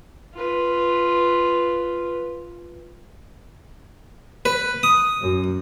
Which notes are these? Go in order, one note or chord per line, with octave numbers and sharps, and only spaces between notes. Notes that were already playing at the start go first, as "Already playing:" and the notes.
F4 B4
B4
D#6
F#2